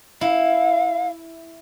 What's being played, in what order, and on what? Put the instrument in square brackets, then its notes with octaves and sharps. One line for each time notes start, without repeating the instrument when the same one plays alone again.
[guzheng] E4 [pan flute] F5